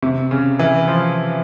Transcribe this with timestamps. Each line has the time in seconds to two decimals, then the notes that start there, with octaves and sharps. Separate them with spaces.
0.03 C3
0.31 C#3
0.59 E3
0.88 F3